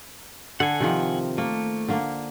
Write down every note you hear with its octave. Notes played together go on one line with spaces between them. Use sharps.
D3 A4 F#5 G#5
C3 D#3 F3
A3 A#3
D3 A#3